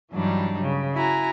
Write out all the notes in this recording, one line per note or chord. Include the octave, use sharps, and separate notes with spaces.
G2 E3 F#3 G3 D4 D#4
C#3
E4 F#4 G#5 A#5